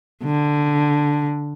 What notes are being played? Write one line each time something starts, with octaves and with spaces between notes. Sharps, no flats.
D3